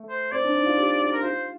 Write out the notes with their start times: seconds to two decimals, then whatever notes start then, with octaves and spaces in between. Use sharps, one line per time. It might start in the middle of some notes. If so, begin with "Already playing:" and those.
Already playing: A3
0.09 C5
0.32 C4 D5
0.43 D4
0.55 D#4
0.66 F4
0.77 G4
1.00 F4
1.13 A#4
1.23 F4 C5